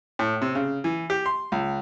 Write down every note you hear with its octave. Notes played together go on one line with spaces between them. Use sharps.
A2
C3
C#3
E3
G4
C6
C#2